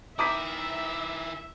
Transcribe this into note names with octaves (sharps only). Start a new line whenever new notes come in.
D#3 E4 E5 A#5 D6 D#6 G6 B6